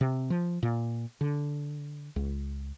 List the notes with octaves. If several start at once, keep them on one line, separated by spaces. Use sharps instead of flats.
C3
F3
A#2
D3
C#2